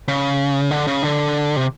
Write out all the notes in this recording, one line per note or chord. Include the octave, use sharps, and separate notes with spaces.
C#3
D3
C#3
D3
C3